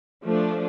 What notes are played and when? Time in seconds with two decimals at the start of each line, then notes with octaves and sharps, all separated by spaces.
0.25 F3 A3 D4